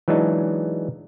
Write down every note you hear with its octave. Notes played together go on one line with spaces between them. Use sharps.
E3 F#3 G#3 D4 D#4